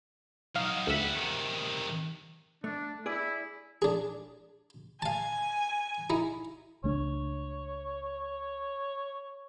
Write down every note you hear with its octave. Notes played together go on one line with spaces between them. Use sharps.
F#3 D#4 F5
D2 G3 E5 F#5
C3 D#3
A3 D4
E4 G#4 D5
D4 G#4
F5 G#5 A5
D#4 E4
C#2 A3 D4 C#5